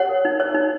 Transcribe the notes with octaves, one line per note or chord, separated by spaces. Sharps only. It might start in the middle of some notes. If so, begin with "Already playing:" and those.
Already playing: C#5 F#5
A#4
D#4
C#5
D#4